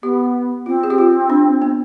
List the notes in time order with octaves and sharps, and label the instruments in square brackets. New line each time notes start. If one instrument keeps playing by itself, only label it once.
[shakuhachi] B3 [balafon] G4
[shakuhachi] C4 [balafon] F4
[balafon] G#4
G4
F4
D4
B3